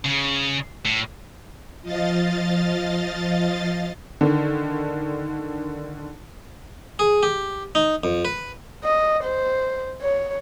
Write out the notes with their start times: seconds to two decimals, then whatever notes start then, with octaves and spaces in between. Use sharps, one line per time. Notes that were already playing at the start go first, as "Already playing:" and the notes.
0.05 C#3
0.86 A2
1.82 F3 D#5 F5 A6
4.21 D3 D#3
6.99 G#4
7.23 G4
7.75 D#4
8.04 F2
8.25 B4
8.84 D#5
9.24 C5
10.02 C#5